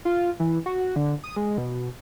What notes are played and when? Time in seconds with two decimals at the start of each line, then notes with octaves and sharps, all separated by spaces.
0.05 F4
0.40 E3
0.66 F#4
0.96 D3
1.24 D#6
1.36 G#3
1.58 B2